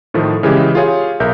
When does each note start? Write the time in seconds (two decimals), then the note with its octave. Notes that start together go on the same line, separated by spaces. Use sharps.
0.14 A2 D#3 F3 A3
0.43 C#3 E3 G#3 E4 G4
0.75 F4 G4 G#4 C#5 F5
1.20 B1 A#4 E5 G6